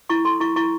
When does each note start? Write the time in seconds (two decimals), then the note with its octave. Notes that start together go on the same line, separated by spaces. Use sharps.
0.09 E4 C#6
0.25 A4 C6
0.40 E4 C#6
0.56 E4 C#6